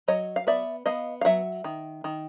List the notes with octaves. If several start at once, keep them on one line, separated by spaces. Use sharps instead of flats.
F#3 C#5 D#5
F5
B3 D5 E5
B3 D#5 F5
F5
F#3 E5 F#5
D#3
D#3